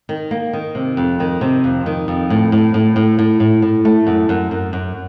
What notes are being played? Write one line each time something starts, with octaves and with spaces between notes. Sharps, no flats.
D#3
A#3
D#3
C3
F2
D#3
C3
F2
D#3
F2
A2
A2
A2
A2
A2
A2
A2
A3
F#2
F#2
F#2
F#2